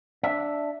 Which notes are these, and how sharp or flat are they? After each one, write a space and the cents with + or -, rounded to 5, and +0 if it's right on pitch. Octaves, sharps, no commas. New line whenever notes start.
D4 +0 E5 +0